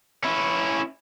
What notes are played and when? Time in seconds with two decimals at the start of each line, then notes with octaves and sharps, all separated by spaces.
0.23 C#4 E4